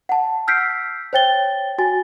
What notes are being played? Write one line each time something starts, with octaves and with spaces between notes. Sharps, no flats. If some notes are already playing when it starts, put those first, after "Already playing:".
F#5 A5
E6 F6 G6 B6 C7 D7
C5 C#5 G5 A6 G7
F#4 G#5 A6